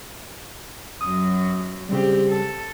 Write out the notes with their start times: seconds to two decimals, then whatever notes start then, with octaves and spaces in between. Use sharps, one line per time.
1.01 F#2 F#3 D#6
1.89 C#3 G3 C4 G4
2.29 A4